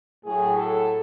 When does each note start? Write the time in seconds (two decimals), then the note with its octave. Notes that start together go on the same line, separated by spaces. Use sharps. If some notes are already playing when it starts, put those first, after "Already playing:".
0.24 A2 F#3 G#4
0.59 A4